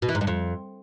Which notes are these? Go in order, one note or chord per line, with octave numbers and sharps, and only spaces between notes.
B2
E3
G#2
G2
F2